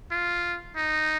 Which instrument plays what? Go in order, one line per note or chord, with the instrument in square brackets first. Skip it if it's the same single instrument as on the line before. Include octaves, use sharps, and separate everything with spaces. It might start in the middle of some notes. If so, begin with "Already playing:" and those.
[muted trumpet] F4
D#4